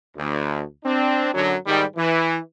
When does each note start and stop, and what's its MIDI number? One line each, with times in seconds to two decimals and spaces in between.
0.17 0.64 38
0.85 1.31 60
0.85 1.31 62
1.34 1.55 42
1.34 1.55 50
1.34 1.55 54
1.66 1.84 44
1.66 1.84 51
1.66 1.84 55
1.96 2.39 52